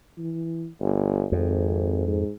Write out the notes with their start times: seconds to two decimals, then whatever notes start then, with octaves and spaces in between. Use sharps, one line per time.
0.18 E3
0.81 G1
1.32 G#1 F2
2.07 G#2